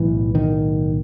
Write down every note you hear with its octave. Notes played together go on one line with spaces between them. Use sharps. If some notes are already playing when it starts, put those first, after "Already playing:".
Already playing: B1 A2 E3
D#3